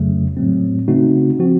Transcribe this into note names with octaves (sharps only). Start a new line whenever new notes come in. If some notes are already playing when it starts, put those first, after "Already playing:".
Already playing: F2 C#3 F#3 A3
A2 F#3 A3 C4
C#3 A3 C4 D#4 F#4
F3 C4 F#4